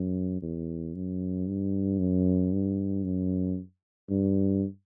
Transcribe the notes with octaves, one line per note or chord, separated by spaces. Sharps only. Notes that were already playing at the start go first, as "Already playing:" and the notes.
Already playing: F#2
E2
F#2
G2
F#2
G2
F#2
G2